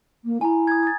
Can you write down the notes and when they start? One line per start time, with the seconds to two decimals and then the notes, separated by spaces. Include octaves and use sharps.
0.25 A#3
0.41 E4 G#5 A#5
0.67 D#6 G#6
0.83 D#6 A6